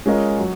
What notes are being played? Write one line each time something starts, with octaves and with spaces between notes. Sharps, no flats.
G#3 C#4 F4 A#4 D#5
F#3